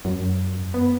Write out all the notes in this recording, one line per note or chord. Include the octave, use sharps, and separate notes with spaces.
F#2
B3